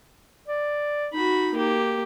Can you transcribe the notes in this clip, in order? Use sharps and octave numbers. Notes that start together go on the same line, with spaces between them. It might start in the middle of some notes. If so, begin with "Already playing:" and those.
D5
D#4 F#4 B5
A#3 G4